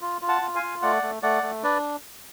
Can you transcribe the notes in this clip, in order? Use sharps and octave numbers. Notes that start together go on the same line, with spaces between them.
F4
F4
F#5 A5
F4
F5 G#5
F4
A3 D5 F#5
A3
A3 D5 F#5
A3
D4 B4 D5